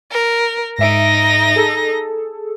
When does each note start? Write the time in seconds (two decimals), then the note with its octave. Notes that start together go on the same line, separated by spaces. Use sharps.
0.11 A#4
0.78 G#2 D#4 E5 A#6 D7
1.56 G#4 A4